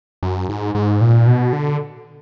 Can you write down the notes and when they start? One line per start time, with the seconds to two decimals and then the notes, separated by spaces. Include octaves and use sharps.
0.23 F#2
0.49 G#2
0.75 G#2
1.01 A#2
1.27 B2
1.53 D3